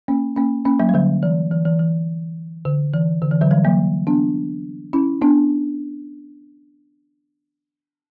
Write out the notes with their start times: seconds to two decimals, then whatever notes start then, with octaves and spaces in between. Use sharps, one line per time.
0.08 A#3 C#4
0.36 A#3 C#4
0.65 A#3 C#4
0.80 F#3 A#3
0.89 G3
0.94 D3 F#3
1.23 E3
1.51 E3
1.66 E3
1.79 E3
2.65 D3
2.94 E3
3.22 D3
3.31 E3
3.41 D3 F#3
3.51 E3 G3
3.65 F#3 A#3
4.07 B3 D4
4.93 C#4 E4
5.22 B3 D4